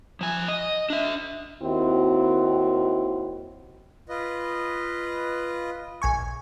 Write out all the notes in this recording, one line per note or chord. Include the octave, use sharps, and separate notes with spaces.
F3 G#5
D#5
D4 E5
D#2 D#3 C4 E4 F#4
F4 B4 D#5
A#1 G#5 C#6